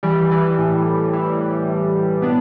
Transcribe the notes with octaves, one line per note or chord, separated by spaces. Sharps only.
E3 G3
E3
A2
A2
E3
E3
A2
A2
B2 B3 D4